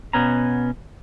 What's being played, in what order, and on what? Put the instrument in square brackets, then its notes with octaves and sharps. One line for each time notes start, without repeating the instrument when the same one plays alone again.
[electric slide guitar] B2 B3 C#4 A#5